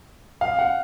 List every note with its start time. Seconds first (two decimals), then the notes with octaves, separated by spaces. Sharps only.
0.41 F5
0.59 F#5